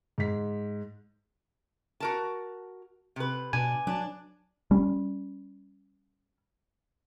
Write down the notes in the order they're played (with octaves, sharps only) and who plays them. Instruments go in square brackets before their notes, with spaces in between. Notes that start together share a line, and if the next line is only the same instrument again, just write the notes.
[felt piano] G#2 B6
[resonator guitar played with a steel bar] F#4 A#4 A5
C3 B4
[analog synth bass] B2 [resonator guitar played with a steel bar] D4 [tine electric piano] G#5
[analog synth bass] F#3 [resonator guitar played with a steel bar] D4
[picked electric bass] G3 C#4